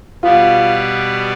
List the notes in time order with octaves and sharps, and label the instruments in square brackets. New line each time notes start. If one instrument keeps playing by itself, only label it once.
[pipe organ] B2 G3 B3 [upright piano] F4